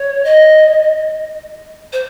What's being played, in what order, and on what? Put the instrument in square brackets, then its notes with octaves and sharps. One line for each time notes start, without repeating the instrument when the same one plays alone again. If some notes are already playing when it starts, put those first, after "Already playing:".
Already playing: [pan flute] C#5
D#5
C5